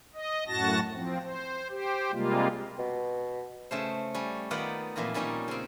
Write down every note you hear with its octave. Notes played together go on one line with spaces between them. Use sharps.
D#5
F#2 A2 F#4 A5 A#6
F3 C4
C5
G4 C5
C3 G3 G#3 A#3 F4
B2
C#3 A3 C5
G3 C#4
D#3 B3 D#4 F4 D5 F#5
F2 A#2 E3 F4 A#5
A#2 G3 C#4 D#4 G5
C#3 C4